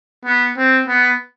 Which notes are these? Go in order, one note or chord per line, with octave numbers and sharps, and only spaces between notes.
B3
C4
B3